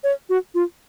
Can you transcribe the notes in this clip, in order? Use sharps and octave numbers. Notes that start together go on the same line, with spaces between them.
C#5
F#4
F4